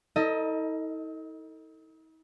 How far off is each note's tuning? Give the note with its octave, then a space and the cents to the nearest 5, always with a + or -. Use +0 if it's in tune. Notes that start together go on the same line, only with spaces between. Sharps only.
D#4 +45 A4 +30 D#5 +15